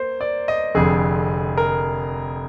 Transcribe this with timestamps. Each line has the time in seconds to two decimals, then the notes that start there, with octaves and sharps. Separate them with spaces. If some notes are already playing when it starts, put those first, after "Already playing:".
Already playing: A#3 C5
0.21 D5
0.48 D#5
0.75 F1 F2 D3 G#4
1.58 A#4